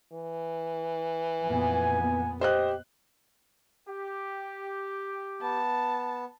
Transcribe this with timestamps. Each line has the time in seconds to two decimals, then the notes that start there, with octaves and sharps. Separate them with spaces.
0.12 E3
1.44 F2 A#2 B3 G#5
2.41 G4 C5 D#5 F#6
3.89 G4
5.42 B3 A5